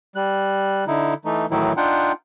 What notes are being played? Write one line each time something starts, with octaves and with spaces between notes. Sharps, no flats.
G3 F#6
D3 D#4 E4
E3 A3 D#4
A2 D#3 E3 F#3 D#4 E4
D4 D#4 F4 F#5 G5